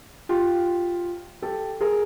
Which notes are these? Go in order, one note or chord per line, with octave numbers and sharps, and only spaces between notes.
F4 G4
G4 A4
G#4 A#4